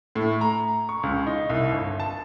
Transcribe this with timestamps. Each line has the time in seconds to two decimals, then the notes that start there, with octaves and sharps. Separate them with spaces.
0.15 A2
0.41 A#5
0.89 C#6
1.03 C#2
1.26 D#4
1.49 C2
1.72 G1
2.00 A5